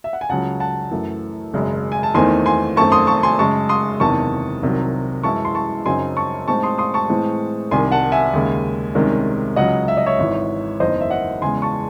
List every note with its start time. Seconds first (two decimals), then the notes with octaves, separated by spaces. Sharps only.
0.04 E5
0.13 F#5
0.21 G#5
0.29 C#2 C#3 F#3 F#5 A5
0.60 F#5 A5
0.91 F#2 E3 A3
1.53 G#1 F#2 C#3 G#3
1.92 G#5
2.03 A5
2.15 E2 D#3 A3 C4 D#4 G#5 C6
2.46 G#5 C6
2.76 F#2 D#3 A3 C4 A5 C#6
2.92 C6 D#6
3.07 A5 C#6
3.23 G#5 C6
3.38 F#2 C#3 G#3 A5 C#6
3.69 C6 D#6
4.00 F#1 E2 C3 D#3 A5 C#6
4.63 C2 C3 D#3 F#3
5.23 F#2 E3 G#3 C#4 E4 A5 C#6
5.45 C6
5.55 A5 C#6
5.86 F#2 C#3 F#3 C4 D#4 G#5 C6
6.17 A5 C#6
6.48 A2 G#3 C4 D#4 A5 C#6
6.63 C6 D#6
6.78 C6 D#6
6.94 A5 C#6
7.09 A2 E3 G#3 C4
7.71 C2 C3 D#3 G#5 C6
7.92 F#5 A5
8.12 E5 G#5
8.33 D#2 C#3 G#3
8.95 C2 C3 D#3 G#3 C#4
9.56 C#2 C#3 F#3 D#5 F#5
9.88 E5
9.97 D#5
10.06 C#5 E5
10.18 G#1 G#2 E3
10.80 F#1 E2 D#3 C5 D#5
11.01 E5
11.10 D#5 F#5
11.41 E2 C#3 G#3 G#5 C6
11.62 A5 C#6